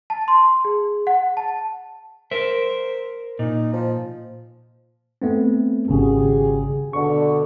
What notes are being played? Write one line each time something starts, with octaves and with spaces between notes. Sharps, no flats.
A5
C6
G#4
F#5
A5
A#4 C5 E5
A#2 D#4
F3
A3 B3 C4
G#1 C#3 G3 F#4 G#4
B2 D3 C#6